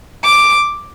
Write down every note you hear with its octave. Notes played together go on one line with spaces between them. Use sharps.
D6